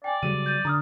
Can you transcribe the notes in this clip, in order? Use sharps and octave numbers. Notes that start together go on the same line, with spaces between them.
D5 G5 G#5
C#3 F#3 G3 D#7
G6 A6 D#7
D3 A#5 D#6 F6